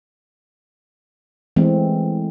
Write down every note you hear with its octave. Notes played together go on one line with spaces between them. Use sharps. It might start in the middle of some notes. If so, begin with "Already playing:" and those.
E3 G#3 A3 C4